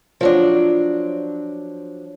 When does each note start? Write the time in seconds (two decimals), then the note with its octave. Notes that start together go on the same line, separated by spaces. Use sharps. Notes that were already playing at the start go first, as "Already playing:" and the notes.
0.21 F3 F#3 D4